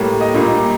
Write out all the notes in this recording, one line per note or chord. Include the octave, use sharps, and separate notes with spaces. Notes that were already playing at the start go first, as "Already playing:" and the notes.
Already playing: A2 G3 A#3
D#5
A#2 G3 A#3